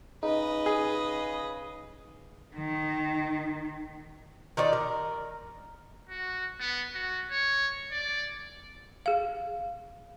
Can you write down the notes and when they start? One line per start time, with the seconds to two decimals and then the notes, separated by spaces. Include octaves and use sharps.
0.23 C#3 D#4 B4 D#5
0.66 G#4
2.56 D#3
4.57 D#3 F4 D5
4.73 A#4
6.09 F#4
6.60 B3
6.95 F#4
7.32 C#5
7.92 D5
9.06 G#4 F5